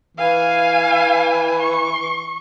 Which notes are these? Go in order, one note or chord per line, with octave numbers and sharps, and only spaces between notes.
E3 F5 G#5
C#6